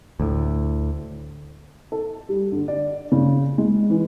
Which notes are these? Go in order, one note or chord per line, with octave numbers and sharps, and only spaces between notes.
D2 A2
A4
G3
D3
D5
C#3
G#3
E3